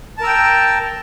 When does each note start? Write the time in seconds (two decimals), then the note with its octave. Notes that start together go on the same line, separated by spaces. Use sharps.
0.18 A5
0.21 A#4
0.24 E6
0.27 G5